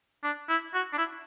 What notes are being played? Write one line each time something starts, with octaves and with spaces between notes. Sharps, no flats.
D4
E4
F#4
D4
E4